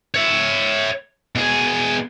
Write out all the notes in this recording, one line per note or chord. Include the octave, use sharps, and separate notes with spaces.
C#5 E5
B2 G#4